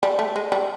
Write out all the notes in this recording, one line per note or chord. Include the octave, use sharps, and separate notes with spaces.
G3
A3
G#3
G3